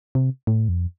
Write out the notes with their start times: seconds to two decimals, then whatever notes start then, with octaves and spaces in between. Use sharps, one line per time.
0.15 C3
0.47 A2
0.69 F2